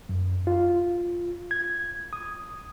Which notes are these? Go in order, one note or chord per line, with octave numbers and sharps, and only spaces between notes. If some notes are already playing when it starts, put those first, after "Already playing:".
F#2
F4
G#6
D#6